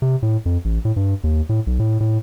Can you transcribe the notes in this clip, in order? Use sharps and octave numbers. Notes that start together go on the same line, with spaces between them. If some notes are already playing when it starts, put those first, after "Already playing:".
C3
A2
F2
A1
A2
G2
D#2
A2
B1
A2
A2